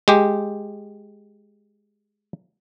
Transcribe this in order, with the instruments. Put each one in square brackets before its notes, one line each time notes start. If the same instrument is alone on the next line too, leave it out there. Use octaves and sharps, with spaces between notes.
[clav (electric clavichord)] G#3 G4